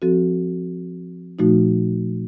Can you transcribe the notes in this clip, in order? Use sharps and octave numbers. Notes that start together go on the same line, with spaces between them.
F3 C4 F#4 A4
A#2 F3 A3 D#4 F#4